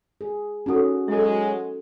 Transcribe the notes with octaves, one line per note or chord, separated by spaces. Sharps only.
G#4
C#4 D#4 F#4 A4
F#3 G#3 A4 E5